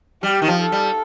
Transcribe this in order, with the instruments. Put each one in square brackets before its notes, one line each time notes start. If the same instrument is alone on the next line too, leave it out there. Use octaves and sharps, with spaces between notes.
[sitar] G3 [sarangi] G4
[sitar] D#3
F3
[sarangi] A4
[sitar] G3